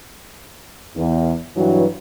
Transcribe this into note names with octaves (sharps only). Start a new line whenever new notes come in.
E2
G2 E3 F#3